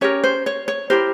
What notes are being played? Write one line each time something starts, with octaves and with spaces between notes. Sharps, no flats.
C#4 G4 A#4 C#5
C5
C#5
C#5
E4 G4 A#4 C5